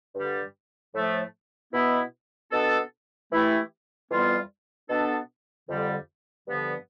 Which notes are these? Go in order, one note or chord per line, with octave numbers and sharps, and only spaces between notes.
G2 D3 G3
A2 F3 A3
B2 B3 E4
B2 B3 D4 A4
E3 A3 E4 G4
F2 E3 G3 B3 F4
B2 B3 D4 A4
F2 D3 G3
G2 D3 F3 B3